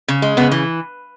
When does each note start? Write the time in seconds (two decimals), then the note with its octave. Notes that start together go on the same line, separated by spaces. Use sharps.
0.08 C#3
0.22 G#3
0.37 C#3 B3
0.51 E3